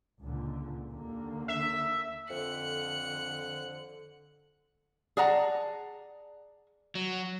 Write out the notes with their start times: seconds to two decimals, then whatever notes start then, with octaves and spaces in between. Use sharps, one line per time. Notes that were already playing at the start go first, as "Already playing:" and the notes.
0.20 C#2 A#2 D3
0.90 D#2 D3 A#3
1.48 E5
2.30 F2 D3 F#6 C#7
5.17 G#4 D5 F#5 A5 A#5
6.95 F#3